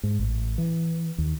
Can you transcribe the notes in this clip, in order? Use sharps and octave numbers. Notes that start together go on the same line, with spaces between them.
G#2
A1
E3
D#2